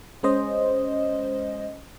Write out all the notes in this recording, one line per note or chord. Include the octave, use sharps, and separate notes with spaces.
G#3 C#4 C5 D#5